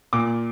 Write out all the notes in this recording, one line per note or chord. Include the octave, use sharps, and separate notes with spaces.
A#2 D6